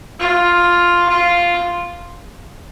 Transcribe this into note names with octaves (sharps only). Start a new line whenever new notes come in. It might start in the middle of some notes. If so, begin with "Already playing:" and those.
F4
F4